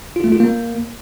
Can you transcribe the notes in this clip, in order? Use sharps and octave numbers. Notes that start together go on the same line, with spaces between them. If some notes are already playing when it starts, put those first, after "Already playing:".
F4
A3
F4
A#3